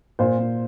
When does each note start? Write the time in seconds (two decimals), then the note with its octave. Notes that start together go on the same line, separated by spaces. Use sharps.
0.19 A#2 C5
0.38 A#2